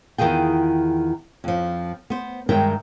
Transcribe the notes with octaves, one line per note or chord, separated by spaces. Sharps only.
E2 D#3 F4 G#4 G5
F2 F3
B3 C5
G2 D#3 G#3 A#4 E5 G5